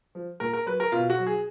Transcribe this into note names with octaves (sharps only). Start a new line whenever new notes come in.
F3
A#2 A#4
A#4
F#3 B4
A#4
B2 F4
F#4
F#3
G#4